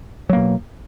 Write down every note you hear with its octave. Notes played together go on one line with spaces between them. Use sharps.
B2 F#3 A#3